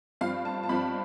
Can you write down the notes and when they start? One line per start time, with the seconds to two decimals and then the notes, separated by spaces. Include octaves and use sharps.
0.21 G2 F3 C4 F5
0.45 A5
0.63 A5
0.69 G2 F3 C4 B5